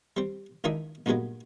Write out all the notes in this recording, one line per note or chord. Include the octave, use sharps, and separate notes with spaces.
G3 C4
C#2 D#3 E3 D4 D#4 E5
C#2 G2 A#2 F#3 G#3 B3